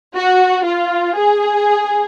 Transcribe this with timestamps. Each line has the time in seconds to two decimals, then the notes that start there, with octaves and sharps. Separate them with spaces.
0.14 F#4
0.64 F4
1.16 G#4